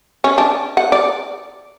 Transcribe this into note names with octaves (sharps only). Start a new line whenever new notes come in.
C#4
D4
F#5
D5